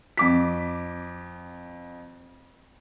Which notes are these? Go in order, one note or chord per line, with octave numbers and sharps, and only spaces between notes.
F2 D6 B6